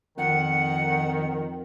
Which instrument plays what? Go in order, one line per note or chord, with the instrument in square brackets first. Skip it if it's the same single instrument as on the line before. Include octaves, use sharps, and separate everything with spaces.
[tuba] F2 [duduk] D#3 [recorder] F#5